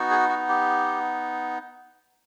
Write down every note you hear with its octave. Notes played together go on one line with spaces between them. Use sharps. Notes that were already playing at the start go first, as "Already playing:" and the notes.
Already playing: B3 D#4 F#4
G#4
F#4
G4